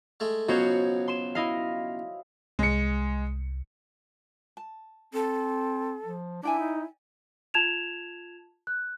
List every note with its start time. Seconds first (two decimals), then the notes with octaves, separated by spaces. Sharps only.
0.20 G#3 A3
0.48 C#2 B2 F#3 F#4 C5 C#5
1.08 C6 E7
1.35 E4 D#5 F5
2.59 C2 G#3 C#7
4.57 A5
5.14 C4 A4
6.05 F3
6.43 D4 E4 D5 G5 G#5
6.59 D#4
7.54 F4 A5 G#6 E7 F7
8.67 F#6